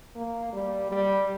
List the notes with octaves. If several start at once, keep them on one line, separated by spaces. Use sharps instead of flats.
A#3
G3
G3